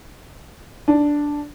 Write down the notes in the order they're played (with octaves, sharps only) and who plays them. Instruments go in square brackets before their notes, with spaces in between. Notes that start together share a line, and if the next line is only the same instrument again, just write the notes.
[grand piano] D4